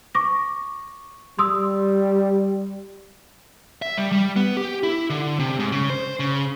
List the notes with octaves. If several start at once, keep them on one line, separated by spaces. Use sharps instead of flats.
C#6 D6 A#6
G3 C6 D#6 E6
E5
G3
G3
B3
G4
E4
D3
C3
G#2
C#3
C5
C#3